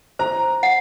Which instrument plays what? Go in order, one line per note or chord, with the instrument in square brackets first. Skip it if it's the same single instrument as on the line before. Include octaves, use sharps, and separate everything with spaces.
[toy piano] C5 [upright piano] A#5
[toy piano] F#5